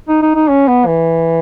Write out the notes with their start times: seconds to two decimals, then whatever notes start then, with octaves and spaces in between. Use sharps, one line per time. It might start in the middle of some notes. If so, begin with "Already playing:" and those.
0.08 D#4
0.22 D#4
0.35 D#4
0.48 C#4
0.68 B3
0.86 E3